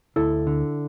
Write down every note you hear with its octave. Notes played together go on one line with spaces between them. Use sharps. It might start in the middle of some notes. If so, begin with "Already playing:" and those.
D2 E4 A4
D3